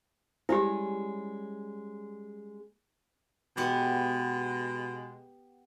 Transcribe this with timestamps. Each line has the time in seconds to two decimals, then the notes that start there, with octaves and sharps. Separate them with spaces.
0.49 G3 G#3 C#4 E4 G4
3.57 B2 G#3 B3 G4